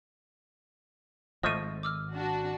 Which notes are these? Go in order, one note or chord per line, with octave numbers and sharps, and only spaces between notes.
G#1 F3 A3 D#5 C#6 D#7
D6 E6 F6
D4 F#4